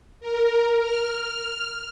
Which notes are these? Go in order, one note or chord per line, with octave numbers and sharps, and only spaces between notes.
A#4
F6